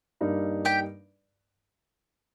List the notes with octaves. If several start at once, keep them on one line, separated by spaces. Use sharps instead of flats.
G2 G3 A#3 D#4
G4 G5